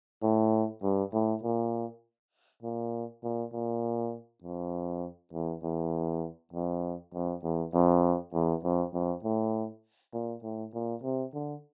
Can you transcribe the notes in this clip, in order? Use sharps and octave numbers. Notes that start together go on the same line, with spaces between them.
A2
G2
A2
A#2
A#2
A#2
A#2
F2
E2
E2
F2
F2
E2
F2
E2
F2
F2
A2
A#2
A2
A#2
C3
D3